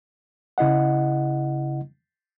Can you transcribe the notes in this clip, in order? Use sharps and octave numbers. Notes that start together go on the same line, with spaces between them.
C#3 E4 D#5 F#5